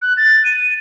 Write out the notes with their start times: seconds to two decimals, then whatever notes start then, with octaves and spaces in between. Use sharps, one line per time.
0.02 F#6
0.17 A6
0.44 D#7